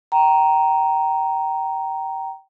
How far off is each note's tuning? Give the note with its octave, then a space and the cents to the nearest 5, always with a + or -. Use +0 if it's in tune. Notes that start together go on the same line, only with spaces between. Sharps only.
G5 -20 A#5 +0